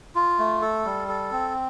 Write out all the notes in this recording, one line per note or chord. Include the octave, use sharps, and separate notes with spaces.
F4
A3
A4
G3
A4
C4